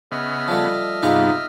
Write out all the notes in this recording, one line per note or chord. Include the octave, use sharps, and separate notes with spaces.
C#3 B3 D#5 E5 F6
F3 G3 A3
G2 C3 B3 D#4 F4 G#4 F5